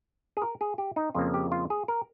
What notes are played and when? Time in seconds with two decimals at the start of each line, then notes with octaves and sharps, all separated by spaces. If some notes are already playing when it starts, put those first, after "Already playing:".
0.37 G#4
0.42 A#4
0.61 G#4
0.78 G4
0.96 D#4
1.14 F2 C#3 F3 A#3 F4
1.34 G4
1.52 F4
1.70 G#4
1.88 A#4